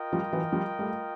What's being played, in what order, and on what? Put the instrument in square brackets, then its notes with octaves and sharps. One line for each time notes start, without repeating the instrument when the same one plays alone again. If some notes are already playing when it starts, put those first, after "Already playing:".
Already playing: [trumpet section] F4 A#4 D#5 G5
[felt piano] F3 G3
E3 F#3
F3 G3
G3 A3